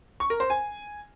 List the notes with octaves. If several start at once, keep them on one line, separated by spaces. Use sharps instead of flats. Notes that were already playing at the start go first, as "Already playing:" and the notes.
C#6
A#4
C5
G#5